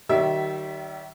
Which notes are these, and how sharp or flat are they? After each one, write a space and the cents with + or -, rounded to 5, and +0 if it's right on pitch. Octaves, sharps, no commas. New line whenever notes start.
D#3 -15 G3 -45 E5 -5